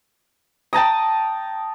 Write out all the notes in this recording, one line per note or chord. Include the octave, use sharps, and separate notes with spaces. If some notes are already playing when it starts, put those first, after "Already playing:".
G5 A5 A#5 D#6